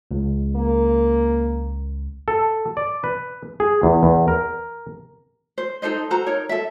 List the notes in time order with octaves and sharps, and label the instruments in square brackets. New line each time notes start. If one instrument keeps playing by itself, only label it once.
[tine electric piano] C#2
[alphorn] A#3
[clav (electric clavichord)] A4
D5
B4
G#4
E2
E2
A#4
[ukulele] C5
D#4 A4 C5 D#5
F#4 A4 C5 A#5
D#4 A#4 C#5
A4 E5